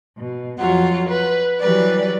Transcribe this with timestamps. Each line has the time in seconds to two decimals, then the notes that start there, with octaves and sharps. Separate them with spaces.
0.17 B2
0.59 F2 F#3 F4 F#5
1.08 B4
1.61 E3 F#3 G3 G4 B4 D5